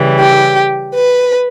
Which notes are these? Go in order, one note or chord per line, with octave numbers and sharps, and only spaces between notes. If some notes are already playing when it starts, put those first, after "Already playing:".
Already playing: C#3 E3 G3
G4
B4